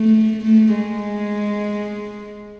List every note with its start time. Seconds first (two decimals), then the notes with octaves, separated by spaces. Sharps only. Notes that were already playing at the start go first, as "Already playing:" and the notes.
Already playing: A3
0.43 A3
0.76 G#3